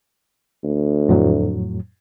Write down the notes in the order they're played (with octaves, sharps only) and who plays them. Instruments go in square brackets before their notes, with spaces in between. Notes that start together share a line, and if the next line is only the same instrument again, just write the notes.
[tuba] D2
[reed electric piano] F2 A2 F#3